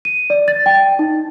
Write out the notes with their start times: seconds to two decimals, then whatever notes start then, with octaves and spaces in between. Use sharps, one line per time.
0.05 D#7
0.30 D5
0.48 A6
0.66 G5
0.99 D#4